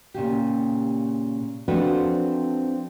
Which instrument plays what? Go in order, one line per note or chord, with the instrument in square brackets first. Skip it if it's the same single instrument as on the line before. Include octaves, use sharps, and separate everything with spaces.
[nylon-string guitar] A#2 C#3 G4
F3 C4 D4 F#4 A4 B4